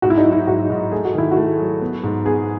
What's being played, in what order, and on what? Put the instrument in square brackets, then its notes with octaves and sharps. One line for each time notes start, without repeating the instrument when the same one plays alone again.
[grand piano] G#2 [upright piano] F#4
[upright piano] E4
D#4
[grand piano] F#3
[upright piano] E4
[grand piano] G#2 [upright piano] F#4
[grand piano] G#2
[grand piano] A3 [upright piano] G#4
[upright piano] F#4
[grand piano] D#3 [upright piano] E4
[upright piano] F#4
[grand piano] A3
F#3
B3
G#2
[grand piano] B3 [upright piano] G#4